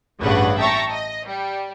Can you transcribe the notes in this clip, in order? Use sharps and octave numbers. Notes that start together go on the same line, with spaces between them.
A1 G2 C#3 D4 B4 F#5
E5 G5 A5 A#5 C#6
D#5
G3